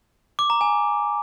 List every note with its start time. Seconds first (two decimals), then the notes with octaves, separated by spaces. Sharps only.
0.39 D6
0.50 A#5
0.61 G#5